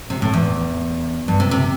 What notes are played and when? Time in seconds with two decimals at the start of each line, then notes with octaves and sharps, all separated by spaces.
0.10 C3
0.22 A2
0.34 E2
1.28 G2
1.40 C3
1.51 C3